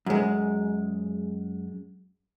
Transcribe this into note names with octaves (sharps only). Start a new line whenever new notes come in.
F#2 G#3